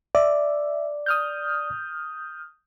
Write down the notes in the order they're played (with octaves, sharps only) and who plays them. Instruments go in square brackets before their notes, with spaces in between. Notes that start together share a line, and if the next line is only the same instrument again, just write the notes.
[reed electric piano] D5 [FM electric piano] E5
[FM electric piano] D#6 F6 G6